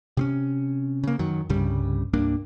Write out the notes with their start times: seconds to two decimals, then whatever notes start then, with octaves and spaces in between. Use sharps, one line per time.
0.17 C3 C4 C#4
1.04 C#3 A#3
1.19 F#2 D#3 F#3
1.49 C2 G2 C#3 G3
2.13 C2 G2 A#3 D4